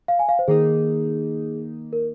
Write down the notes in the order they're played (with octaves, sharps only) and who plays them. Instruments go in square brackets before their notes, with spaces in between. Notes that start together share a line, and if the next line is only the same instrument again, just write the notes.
[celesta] F5
G#5
F5
C5
[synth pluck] D#3 A#3 D#4 [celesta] G#4
[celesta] A#4